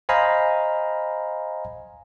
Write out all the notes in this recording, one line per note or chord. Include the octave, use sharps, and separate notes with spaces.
C5 D#5 F5 G#5 A#5 B5